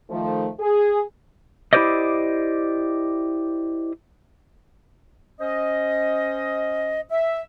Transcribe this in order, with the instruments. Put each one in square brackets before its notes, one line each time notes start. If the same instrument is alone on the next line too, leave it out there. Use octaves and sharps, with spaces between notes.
[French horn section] D#3 F3 A3
G#4
[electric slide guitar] E4 G4 B4 C5 D5 D#5
[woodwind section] C#4 C5 D#5
E5